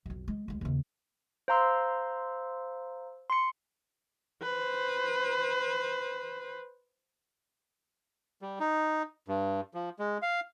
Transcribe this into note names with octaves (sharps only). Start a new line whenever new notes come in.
B1 F2
G#3
D2 G#3
D#2 C#3
C5 F5 A#5 C6 E6
C6 C#7
B4 C5
G3
D#4
G2
F3
G#3
F5